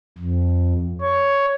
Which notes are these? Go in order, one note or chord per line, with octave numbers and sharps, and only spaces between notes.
F2
C#5